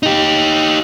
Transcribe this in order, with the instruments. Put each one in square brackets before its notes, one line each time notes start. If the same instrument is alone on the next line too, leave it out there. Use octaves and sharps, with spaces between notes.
[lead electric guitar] D#4 G4